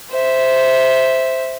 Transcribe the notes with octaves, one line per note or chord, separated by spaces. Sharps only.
C5 E5